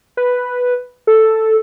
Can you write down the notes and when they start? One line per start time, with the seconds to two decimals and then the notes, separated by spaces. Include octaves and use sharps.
0.17 B4
1.07 A4